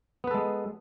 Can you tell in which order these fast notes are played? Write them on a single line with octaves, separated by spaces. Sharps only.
B3 B4 A4 G#3